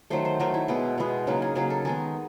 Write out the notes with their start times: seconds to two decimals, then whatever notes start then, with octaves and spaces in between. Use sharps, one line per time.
0.10 D#3 F#3 A3 C5
0.25 C5
0.40 D#3 F#3 A3 A#4
0.54 E4
0.68 B2 G#3 B3
0.98 B2 G#3 B3
1.27 C#3 F#3 A#3 D#4
1.42 G#4
1.55 C#3 F#3 A#3 G#4
1.70 A4
1.85 D#3 G#3 B3 G#4